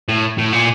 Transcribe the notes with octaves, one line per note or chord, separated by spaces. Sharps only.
A2
A2
A#2